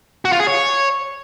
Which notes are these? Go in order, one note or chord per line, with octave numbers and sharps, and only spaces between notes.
F#4
F4
G#4
C#5